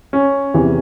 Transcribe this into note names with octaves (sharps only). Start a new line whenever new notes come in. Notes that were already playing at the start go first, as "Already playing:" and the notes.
C#4
E2 C3 E3